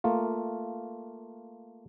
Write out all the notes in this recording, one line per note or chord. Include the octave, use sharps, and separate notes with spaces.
A3 A#3 F4